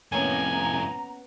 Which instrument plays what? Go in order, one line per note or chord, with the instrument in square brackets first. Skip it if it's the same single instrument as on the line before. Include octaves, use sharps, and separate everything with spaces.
[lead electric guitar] F2 A2 [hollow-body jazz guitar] A#3 B3 C#4 [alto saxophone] G#5 [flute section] A#5